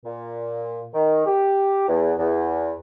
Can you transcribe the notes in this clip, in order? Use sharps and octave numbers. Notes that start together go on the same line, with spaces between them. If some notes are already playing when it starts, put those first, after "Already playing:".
A#2
D#3
G4
E2
E2